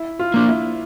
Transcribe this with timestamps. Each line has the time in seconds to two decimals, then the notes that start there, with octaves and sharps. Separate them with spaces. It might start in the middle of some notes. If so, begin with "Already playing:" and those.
Already playing: E4
0.19 F4
0.34 A#3 D4
0.48 E4